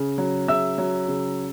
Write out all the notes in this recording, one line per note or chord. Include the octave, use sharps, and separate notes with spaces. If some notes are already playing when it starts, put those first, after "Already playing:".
Already playing: C#3
F#3
C#3 E5 E6
F#3
C#3